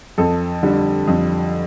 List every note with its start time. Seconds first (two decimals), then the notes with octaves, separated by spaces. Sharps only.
0.18 F2 A4
0.63 D3 G3
1.07 F2